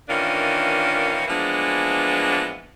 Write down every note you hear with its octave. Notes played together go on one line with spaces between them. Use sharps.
D#3 E3 A#3 C#4 D4 F4
E3 F3 G#3 A#3 B3 D4